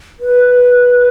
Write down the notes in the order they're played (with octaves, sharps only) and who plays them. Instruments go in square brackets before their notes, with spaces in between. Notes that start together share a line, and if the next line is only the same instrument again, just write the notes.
[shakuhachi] B4